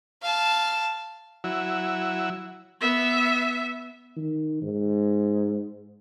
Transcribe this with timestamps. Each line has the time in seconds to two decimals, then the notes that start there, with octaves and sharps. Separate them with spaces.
0.22 F5 A5
1.44 F#3 E4
2.81 B3 E5
4.16 D#3
4.62 G#2